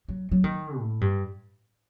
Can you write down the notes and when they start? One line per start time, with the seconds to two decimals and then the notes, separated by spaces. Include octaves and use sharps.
0.08 F#3
0.32 F#3
0.44 D#3
0.78 A2
1.01 G2